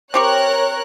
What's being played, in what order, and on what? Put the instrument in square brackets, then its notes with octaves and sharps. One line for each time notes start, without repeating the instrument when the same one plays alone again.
[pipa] C4 G4 C#6 [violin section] A#4 C#5 F#6